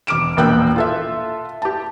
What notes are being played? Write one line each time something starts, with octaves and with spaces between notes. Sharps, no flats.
E1 D6 F6 D7 E7
E1 A#1 A#3 G5 E6 F#6
F4 A4 E5
G4 A5